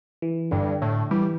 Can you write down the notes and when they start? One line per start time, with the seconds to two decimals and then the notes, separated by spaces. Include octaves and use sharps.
0.22 E3
0.51 G2 D3
0.82 A2
1.11 E3 G3